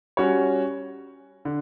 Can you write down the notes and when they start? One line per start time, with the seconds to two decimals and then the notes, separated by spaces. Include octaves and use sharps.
0.17 G3 C#4 F#4 C#5
1.45 D3